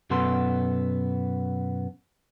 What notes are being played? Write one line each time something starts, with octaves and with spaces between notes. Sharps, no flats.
F#2 B2 B3 A4 C6